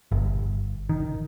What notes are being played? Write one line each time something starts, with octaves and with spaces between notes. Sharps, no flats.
G1
D#3